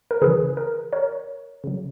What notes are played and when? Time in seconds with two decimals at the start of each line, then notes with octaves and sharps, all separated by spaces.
0.11 A#4
0.22 C#3 E3 G#4 B4
0.57 A#4
0.93 A#4 C#5
1.64 C#3 F#3